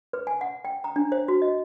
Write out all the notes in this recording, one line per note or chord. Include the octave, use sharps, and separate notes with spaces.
B4
G#5
F#5
G5
A#5
D4
C5
F#4
D#5